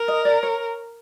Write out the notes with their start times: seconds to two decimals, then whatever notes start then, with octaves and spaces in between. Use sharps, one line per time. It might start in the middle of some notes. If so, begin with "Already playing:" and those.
Already playing: A#4
0.08 D#5
0.25 D5
0.43 C#5